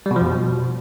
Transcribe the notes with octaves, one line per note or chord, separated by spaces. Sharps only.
G3
B2
F3
F2
B2